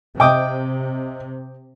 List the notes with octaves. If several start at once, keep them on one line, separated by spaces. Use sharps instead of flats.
C3 D#5 E5 G5 D6 D#6